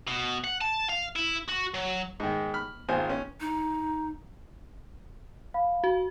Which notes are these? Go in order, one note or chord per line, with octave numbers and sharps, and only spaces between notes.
B2
F#5
A5
F5
E4
F#4
F#3
G#2 D#3
B5 F6
G#1 D#3 F4 C5 G#5
C#4
D#4
F5 B5
F#4